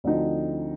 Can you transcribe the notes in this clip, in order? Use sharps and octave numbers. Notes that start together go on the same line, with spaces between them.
D2 D3 F3 C4 D#4